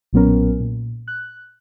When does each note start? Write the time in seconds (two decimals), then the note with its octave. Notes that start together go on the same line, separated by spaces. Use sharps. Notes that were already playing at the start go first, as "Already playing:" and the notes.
0.13 B1 A#2 F#3 B3 C#4 A#4
0.60 A#2
1.08 F#6